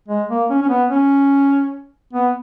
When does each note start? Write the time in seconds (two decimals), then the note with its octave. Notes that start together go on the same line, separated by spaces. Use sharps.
0.08 G#3
0.29 A#3
0.50 C#4
0.62 C#4
0.69 B3
0.90 C#4
2.13 B3